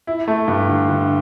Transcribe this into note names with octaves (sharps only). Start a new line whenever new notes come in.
E4
A3
G2
D3
D3